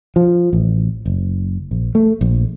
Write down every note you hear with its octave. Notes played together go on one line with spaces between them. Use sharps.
F3
A1
F#1
A#1
A3
A#1